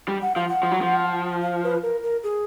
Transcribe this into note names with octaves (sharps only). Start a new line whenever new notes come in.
G3
F#5
F3 F5
F#5
F3
F#3
F3
F5
B4
A#4
A#4
G#4